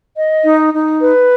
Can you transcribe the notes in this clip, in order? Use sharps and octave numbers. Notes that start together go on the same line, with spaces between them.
D#5
D#4
D#4
B4